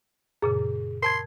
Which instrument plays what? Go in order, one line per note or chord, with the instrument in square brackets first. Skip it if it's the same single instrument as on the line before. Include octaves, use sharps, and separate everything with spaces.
[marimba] F#2 A#2 C#3 [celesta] G#4
[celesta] A#4 A5 G#6 [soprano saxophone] C6